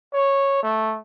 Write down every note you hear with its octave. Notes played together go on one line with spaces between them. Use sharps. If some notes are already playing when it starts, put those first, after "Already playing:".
C#5
A3